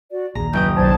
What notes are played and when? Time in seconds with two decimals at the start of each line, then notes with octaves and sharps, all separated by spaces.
0.10 F#4 D5
0.35 A#1 D#2 G#4 A#5
0.53 F#1 B4 G5 D#6 G6
0.77 B1 C5 D5 A5 G#6